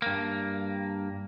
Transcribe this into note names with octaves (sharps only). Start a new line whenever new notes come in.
G2 A#3